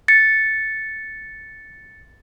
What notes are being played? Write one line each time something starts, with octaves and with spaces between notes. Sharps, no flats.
A6 C#7